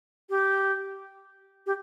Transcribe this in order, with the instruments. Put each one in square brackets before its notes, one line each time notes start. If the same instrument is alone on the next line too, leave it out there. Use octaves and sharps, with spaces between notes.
[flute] G4
G4